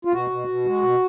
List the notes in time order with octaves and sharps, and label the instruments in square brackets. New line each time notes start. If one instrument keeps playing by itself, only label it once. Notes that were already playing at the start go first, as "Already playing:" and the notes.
[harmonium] F4
B2 F#4
B2
B2
G#3
B2